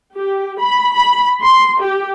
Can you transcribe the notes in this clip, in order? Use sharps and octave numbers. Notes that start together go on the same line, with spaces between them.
G4
B5
B5
C6
G4